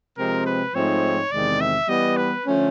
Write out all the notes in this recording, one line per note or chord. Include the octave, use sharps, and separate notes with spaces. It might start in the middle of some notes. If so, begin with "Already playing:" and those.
C3 F3 G#3 C4 A#4
B4
G#2 F3 A3 C4 D#4 C#5
E2 C3 D#3 G#3 C4 D5
E5
E3 G3 B3 D#5
B4
D3 F3 A3 C#4